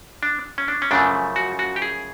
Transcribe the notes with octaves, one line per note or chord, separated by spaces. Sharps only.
D4
C#4
D4
C#4
F#2 C#3 F3 A3 D4
F#4
F#4
G4
G#4